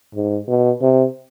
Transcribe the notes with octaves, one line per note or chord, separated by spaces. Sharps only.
G#2
B2
C3